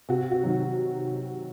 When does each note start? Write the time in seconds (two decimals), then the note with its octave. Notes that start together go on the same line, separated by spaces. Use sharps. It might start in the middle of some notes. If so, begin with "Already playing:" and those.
0.09 C3 F#4
0.31 F#4
0.43 D#3 F#3